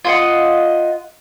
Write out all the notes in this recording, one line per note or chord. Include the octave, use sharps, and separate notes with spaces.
F4 D#5 F#5